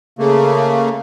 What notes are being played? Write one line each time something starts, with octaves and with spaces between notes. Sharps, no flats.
C#3 A3 A#3